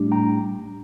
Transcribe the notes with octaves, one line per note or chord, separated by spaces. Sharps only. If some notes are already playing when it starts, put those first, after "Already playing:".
Already playing: A2 G3 D4
G5 A#5